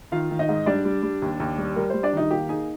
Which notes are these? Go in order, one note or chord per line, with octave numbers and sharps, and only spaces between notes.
D#3 F4 F5
D#3
D#4 D#5
G#2
G3 D4 D5
G3
G3
D#2
D#2
G3
G3 A#4
G3 C5
D4 D5
D#3 D#4 D#5
A#3 G4 G5
D#4 G#4 G#5